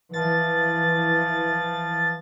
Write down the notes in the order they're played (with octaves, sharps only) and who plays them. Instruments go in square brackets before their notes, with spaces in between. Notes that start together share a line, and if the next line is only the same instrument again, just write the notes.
[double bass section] E3 [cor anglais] F3 [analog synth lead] A6